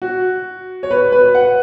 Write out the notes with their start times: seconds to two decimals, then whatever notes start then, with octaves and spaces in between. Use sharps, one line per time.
0.02 F#4
0.83 C#5
0.91 B4
1.12 B4
1.35 F#5